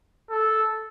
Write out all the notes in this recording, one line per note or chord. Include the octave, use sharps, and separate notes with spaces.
A4